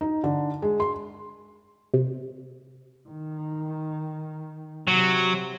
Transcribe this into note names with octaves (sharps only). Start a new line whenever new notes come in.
D#4
D3
G#3
C6
C3
D#3
C3 F#3